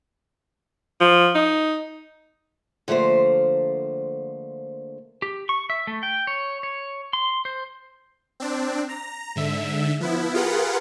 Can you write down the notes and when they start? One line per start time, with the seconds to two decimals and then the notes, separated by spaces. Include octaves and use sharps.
1.00 F3
1.35 D#4
2.88 D3 F3 A3 A#3 C5
5.22 G4
5.49 C#6
5.70 E5
5.87 A3
6.03 G5
6.27 C#5
6.63 C#5
7.13 C6
7.45 C5
8.40 C4 D4
8.89 A#5
9.36 G#2 D3 E5
10.00 F3 B3 E4
10.34 F4 G4 G#4 A#4 B4 F#5